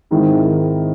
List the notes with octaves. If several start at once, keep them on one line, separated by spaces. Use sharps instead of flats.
G#2 D#3 G#3 C4 E4